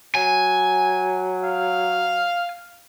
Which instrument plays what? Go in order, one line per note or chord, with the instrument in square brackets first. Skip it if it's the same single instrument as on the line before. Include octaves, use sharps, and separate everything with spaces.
[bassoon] F#3 [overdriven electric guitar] G#5
[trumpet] F5